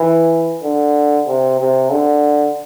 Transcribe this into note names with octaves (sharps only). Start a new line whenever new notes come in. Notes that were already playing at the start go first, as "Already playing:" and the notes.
Already playing: E3
D3
C3
C3
D3